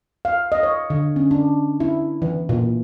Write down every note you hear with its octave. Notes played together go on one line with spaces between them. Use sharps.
F5
D#5
C#5
D3
C#4
D4
E4
E3
A#2